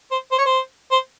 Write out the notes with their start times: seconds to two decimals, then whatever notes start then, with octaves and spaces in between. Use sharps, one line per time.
0.11 C5
0.32 C5
0.38 C#5
0.46 C5
0.91 C5